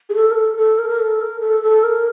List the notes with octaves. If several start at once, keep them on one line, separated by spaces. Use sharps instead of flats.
G#4
A4
A#4
A4
A4
A#4
A#4
A4
A#4
A4
A4
A#4